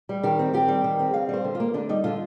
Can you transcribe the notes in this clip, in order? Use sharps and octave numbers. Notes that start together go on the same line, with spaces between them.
G3
D#3 G4
C4
D#3 G4
G3
D#3
C4
D3 F5
G3 C5
D3
F4
A#3
D3 D4
G3 D#4
D3 F4